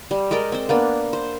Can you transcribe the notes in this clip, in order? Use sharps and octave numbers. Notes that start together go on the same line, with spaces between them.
G3
G#3 A#4 D5 G5
C4 C5
A#3 B3 D4
C5